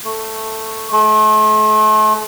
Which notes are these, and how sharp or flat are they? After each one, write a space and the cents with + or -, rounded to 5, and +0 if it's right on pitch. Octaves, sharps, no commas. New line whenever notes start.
A3 +5
A3 -40